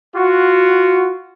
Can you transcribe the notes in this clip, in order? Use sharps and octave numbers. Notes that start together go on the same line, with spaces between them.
F4 F#4